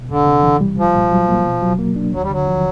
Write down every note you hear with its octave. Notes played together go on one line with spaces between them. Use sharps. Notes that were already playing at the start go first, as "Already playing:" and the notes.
Already playing: B2
E2 D3
C3
E3
G3
C2 F3
A#2
F#3
A#3
B2
F#3
A#3
D4
D#2 F#3
G3
D3 F#3
F3